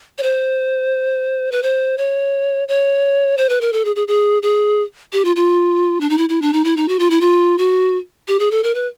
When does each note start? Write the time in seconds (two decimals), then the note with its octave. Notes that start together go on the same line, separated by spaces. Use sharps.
0.18 C#5
0.23 C5
1.52 B4
1.63 C5
1.98 C#5
2.68 C#5
3.37 C5
3.49 B4
3.61 A#4
3.73 A4
3.85 G#4
3.96 G#4
4.08 G#4
4.43 G#4
5.13 G4
5.25 F4
5.36 F4
6.01 D4
6.10 D#4
6.18 E4
6.29 E4
6.42 D4
6.53 D#4
6.64 E4
6.77 D#4
6.88 F#4
6.99 F4
7.10 E4
7.21 F4
7.58 F#4
8.28 G4
8.39 G#4
8.51 A4
8.64 A#4
8.75 B4